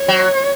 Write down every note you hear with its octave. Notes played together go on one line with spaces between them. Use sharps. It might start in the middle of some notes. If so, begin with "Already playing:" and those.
Already playing: C#5
F#3